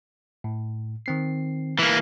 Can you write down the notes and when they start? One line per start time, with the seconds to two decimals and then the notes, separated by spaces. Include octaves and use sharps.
0.44 A2
1.06 D#3 C4 C7
1.79 E3 A#3